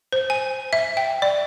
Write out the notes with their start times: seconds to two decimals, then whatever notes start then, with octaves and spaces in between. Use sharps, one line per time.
0.12 C5
0.30 G#5
0.73 E5
0.97 G5
1.22 D5